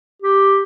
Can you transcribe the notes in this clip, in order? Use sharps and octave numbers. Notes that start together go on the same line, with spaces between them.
G4